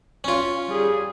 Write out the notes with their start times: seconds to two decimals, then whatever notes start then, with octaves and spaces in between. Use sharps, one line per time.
0.24 C#4 F4
0.66 G3 G#4